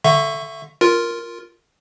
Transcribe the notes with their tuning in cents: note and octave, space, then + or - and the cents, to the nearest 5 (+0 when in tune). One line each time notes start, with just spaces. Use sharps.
D3 +0 E5 +20 C#6 +0
F4 +0 A#4 +0